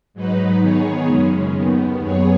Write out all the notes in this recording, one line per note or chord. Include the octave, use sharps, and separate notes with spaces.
G#2 F#3 D#4 B4
D#3 B3 G#4 C#5
F#2 C#3 G#3 C#4
D#2 D#3 B3
F#2 F#3 B3 G#4 C#5